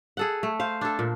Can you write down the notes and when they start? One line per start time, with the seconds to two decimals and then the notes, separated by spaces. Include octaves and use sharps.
0.17 G#4 A4 F#5
0.43 A3
0.60 C5 F5
0.81 D4 A4
0.99 A#2